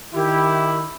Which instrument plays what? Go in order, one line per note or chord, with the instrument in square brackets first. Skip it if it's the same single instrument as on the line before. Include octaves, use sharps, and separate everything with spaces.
[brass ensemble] D#3 E4 [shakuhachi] G4